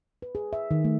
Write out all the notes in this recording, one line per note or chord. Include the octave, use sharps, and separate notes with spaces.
B4
G#4
E5
D#3
A3